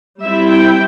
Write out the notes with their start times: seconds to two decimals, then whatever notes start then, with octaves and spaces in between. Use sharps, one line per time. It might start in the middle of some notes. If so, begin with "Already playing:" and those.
0.22 G3 C4 E4 E5
0.51 G5